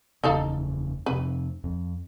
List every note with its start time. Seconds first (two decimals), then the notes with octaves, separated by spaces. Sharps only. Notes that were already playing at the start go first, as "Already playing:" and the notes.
0.24 F#1 E2 C#3 D#4 A4 F5
1.06 F2 C3 C4 B4
1.64 F2